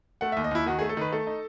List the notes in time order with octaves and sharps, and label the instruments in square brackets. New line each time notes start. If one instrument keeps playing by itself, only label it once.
[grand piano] A3 F#5
E5
D#2
D#5
D#2 E4
D#3 F#4
A3 G#4
A4
D#3 B4
A3 A4
D#4